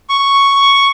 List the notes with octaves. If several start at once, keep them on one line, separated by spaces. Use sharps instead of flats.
C#6